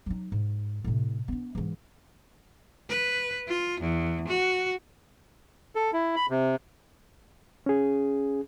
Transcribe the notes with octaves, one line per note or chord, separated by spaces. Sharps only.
F#3 D#4
G#2
A2 C3
B3 D4
G#2 E3
B4
F4
E2
F#4
A4
E4
B5
C3
C#4 G#4